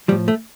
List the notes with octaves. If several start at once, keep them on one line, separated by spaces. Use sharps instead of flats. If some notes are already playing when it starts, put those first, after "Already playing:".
A2 F3 G3
A3